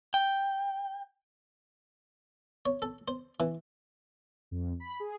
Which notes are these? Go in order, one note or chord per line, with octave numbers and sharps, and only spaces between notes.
G5
C#5
A4
C5
E3
F2
B5
G#4